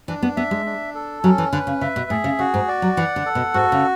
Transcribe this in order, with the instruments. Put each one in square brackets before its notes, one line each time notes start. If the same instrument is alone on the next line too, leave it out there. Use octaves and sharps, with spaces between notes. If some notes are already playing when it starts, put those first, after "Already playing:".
[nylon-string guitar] E3 [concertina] D4
[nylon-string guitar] B3
[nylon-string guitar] B3 [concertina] E5
[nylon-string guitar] G#3
[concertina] D4
A4
[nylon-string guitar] F#3 [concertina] C#4
[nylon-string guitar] E3
[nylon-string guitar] D3 [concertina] B4
[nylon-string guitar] C#3
[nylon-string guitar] C#3 [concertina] E5
[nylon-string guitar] B2
[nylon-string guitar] A2 [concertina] G#4
[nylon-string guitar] C#3
[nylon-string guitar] C#3 [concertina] F#4
[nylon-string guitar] G#2
[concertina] D5
[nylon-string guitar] F#3
[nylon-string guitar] E3 [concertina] F#5
[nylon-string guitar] D3
[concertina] A4
[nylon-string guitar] B2
[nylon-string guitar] G#2 [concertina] F#4
[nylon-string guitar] C#3